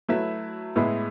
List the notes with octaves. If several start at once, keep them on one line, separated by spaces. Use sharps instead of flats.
F#3 A3 E4 B4 E5
A2 G#3 B3 E4